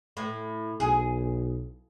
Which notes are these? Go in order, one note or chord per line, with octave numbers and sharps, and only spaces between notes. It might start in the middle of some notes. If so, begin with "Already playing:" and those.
A2
B1 G#4